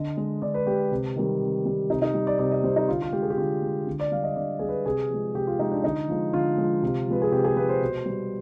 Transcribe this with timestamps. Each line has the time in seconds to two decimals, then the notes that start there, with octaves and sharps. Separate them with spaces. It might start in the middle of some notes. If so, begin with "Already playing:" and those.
Already playing: D3 D#5
0.17 G#3
0.42 D3 D5
0.54 B4
0.67 G#3 G4
0.91 C3
1.16 D#3 G3
1.41 C3
1.65 D#3 G3
1.90 C3 D#4
2.02 D#4
2.14 G3
2.27 D5
2.39 C3 D5
2.51 D#5
2.64 G3 C5
2.76 D#4
2.88 D3 F4
3.02 F4
3.13 G#3 G4
3.22 G#4
3.30 G4
3.38 D3 F4
3.62 G#3
3.87 D3
4.00 D5
4.12 G3 F5
4.24 D#5
4.36 D3 D5
4.59 G3 G#4
4.69 B4
4.86 C3 G#4
5.10 F3 G#3
5.35 C3 G4
5.47 F4
5.59 F3 G#3 D#4
5.72 D4
5.84 D3 D#4
6.09 F3 G#3
6.33 D3 F4
6.58 F3 G#3
6.82 C3
7.08 F3 G#3 B4
7.22 G#4
7.31 C3 G4
7.45 G#4
7.56 F3 G#3 B4
7.69 C5
7.81 B2
8.06 G3